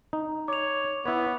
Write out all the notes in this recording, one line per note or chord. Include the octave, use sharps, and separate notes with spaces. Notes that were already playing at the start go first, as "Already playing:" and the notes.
D#4
C#5 D6 F7
B3 E4 C#5